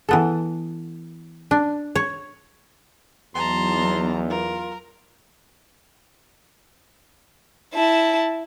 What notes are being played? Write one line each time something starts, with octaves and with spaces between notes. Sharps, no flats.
E3 B3 A4
D4
C#5
E2 F#3 B3 D#4 A5 A#5 C6
F4 A#4
E4 A5